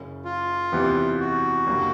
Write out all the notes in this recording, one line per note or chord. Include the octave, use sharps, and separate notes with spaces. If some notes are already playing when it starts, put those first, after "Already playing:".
Already playing: F#1 F#2 C#3
F4
E2 C3 E3 G3 B3
F#4
F#1 F#2 D3 G3 A#3